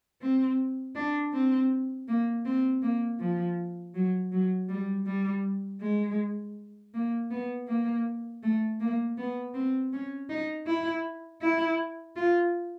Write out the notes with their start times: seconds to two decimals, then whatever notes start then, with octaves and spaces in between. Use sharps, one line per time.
0.22 C4
0.95 D4
1.33 C4
2.08 A#3
2.45 C4
2.82 A#3
3.20 F3
3.95 F#3
4.32 F#3
4.69 G3
5.07 G3
5.81 G#3
6.94 A#3
7.30 B3
7.68 A#3
8.43 A3
8.80 A#3
9.18 B3
9.54 C4
9.93 C#4
10.30 D#4
10.67 E4
11.42 E4
12.16 F4